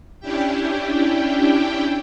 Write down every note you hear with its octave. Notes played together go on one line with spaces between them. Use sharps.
C#4 D4 E4 G4 G5